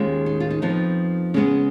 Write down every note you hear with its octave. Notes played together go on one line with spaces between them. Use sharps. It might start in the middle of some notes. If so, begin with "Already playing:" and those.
Already playing: D#2 D#3 G#3 C#4 F4
D#4
F4
D#4
F2 F3 B3 D#4
C#3 G#3 B3 C#4